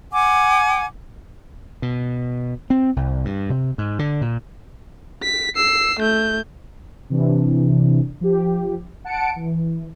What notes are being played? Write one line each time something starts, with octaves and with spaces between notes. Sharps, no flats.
F#5 G#5 D6
B2
C4
C2
G2
C3
G#2
D3
A#2
B6
E6 C7
A3 G6
C3 E3 D4
F3 G4
F#5 A5 C#7 D7
E3